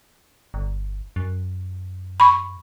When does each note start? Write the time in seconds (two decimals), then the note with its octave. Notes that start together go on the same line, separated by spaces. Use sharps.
0.54 G1
1.16 F#2
2.20 B5 C#6